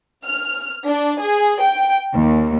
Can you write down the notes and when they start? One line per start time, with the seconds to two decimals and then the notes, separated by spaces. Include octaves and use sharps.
0.26 F6
0.87 D4
1.22 G#4
1.63 G5
2.14 D#2